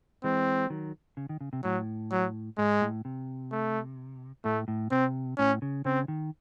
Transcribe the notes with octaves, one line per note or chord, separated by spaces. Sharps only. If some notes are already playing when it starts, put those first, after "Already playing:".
E3 G#3 C4
D#3 F#3
C#3
D#3
C#3
C3
A2 F#3
F#3
G#2 G#3
A2
C3
A3
A2 A3
A2
C3 C4
A2 C#4
C#3
C#3 C4
D#3